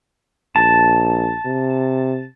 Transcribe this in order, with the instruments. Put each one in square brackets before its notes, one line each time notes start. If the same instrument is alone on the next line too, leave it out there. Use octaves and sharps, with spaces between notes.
[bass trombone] A#1 [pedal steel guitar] A5
[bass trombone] C3